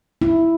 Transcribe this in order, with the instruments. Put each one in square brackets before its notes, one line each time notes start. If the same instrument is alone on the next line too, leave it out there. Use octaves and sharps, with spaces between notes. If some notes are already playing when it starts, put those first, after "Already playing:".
[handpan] E4